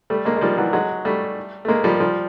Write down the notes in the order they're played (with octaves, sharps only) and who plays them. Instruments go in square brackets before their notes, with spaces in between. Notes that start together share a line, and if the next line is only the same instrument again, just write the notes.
[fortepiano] G3 A3
G#3 A#3
G#3
F3 G3
E3 F#3
F#3 G#3
G3 A3
A3
G#3 A#3
F3 G3
F3 G3